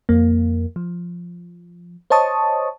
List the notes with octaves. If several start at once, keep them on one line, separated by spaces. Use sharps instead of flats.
F2 A#3
F3
C5 C#5 D#5 A5 C#6 D#6